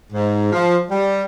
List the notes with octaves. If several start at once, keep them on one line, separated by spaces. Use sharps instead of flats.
G#2
F3
G3